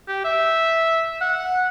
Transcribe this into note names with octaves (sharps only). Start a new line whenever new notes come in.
G4
E5
F#5